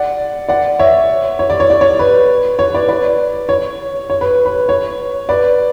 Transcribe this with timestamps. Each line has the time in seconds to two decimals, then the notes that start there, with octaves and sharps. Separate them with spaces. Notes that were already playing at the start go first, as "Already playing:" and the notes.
Already playing: D5 F#5
0.49 D5 F#5
0.79 C#5 E5
1.39 C#5
1.50 D5
1.60 C#5
1.70 D5
1.81 C#5
1.99 B4
2.59 C#5
2.74 B4 D5
2.88 B4 D5
3.49 C#5
4.10 C#5
4.21 B4
4.46 B4
4.69 C#5
5.29 B4 D5